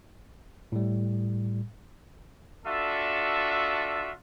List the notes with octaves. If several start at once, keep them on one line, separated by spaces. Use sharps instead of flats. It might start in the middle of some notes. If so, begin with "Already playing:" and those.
A2 G3
D4 F4 F#4 A4 E5